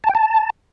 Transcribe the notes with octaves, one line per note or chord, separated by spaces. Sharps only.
A5
G5
A5